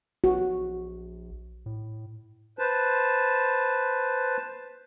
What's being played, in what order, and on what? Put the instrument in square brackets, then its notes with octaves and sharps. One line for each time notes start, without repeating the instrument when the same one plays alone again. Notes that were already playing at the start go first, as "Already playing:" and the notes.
[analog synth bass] A#1 [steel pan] F#4
[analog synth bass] A2
[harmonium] B4 C5 A5